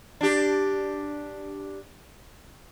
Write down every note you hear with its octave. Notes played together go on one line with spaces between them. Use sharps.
D4 G4